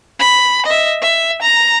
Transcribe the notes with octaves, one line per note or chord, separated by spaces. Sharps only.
B5
D#5 E5
E5
A#5